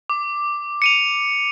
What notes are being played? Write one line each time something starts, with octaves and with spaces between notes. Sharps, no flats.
D6
C#7 D#7 F7